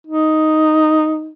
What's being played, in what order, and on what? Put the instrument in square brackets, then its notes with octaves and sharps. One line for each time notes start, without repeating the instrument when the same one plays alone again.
[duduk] D#4